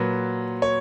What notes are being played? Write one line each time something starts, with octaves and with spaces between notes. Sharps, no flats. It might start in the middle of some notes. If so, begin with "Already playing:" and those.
Already playing: A#2 F#3 B4
C#5